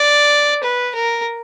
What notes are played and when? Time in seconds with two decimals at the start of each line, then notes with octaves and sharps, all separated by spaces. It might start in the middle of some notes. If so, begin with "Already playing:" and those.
Already playing: D5
0.64 B4
0.95 A#4